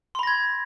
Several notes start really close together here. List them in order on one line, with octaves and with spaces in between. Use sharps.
C6 B5 A#6 G#6